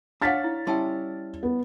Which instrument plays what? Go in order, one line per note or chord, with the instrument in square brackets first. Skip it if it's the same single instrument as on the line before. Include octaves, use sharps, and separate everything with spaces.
[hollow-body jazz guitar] D4 C#5 F#5 [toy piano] F5 G#5 [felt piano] F6 A6 B6
[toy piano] E4
[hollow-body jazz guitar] G3 C#4 E4 [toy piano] G5 A5 C6
[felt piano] B3